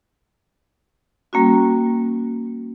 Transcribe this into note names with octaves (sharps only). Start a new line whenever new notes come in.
G3 A#3 C#4 F#4